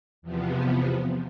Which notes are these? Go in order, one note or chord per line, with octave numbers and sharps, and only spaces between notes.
E2 C3 F3 B3